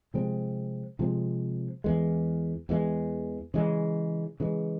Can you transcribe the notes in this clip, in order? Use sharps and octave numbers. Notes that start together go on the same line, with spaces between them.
C3 F3 G#3 C4
C3 F3 G#3 C4
E2 E3 G#3
E2 E3 G#3
C#3 E3 G#3
C#3 E3 G#3